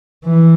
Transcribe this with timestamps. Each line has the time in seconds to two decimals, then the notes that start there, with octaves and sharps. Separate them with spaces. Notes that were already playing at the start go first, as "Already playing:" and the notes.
0.25 E3